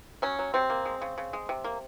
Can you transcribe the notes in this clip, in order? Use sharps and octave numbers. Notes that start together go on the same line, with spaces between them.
F#3 C#4
F#3
C3 C4
A#3
G#3
C#3
C#3
G#3
C3
A#3